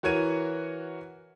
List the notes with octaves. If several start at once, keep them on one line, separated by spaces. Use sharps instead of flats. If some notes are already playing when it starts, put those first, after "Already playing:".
E3 F#4 A#4 C#5 G#6 D#7